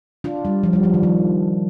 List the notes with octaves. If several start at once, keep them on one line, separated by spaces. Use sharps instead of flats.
D4 F4
G3
F3
G3
F3
D#3
F3